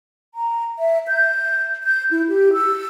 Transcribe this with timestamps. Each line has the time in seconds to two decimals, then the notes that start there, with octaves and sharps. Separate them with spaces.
0.35 A#5
0.79 E5
1.08 G6
1.84 G6
2.11 E4
2.29 G4
2.53 E6